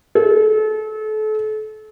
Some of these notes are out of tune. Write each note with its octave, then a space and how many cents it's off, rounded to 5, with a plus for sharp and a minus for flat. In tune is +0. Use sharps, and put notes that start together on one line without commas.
A4 -35